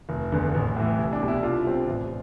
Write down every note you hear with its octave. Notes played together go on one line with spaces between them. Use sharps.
F1
E2 D3
A1
A2 E3
C2 E4
D4
B2 G3
E4
C2 D4 F4
C3 G3 C4
A1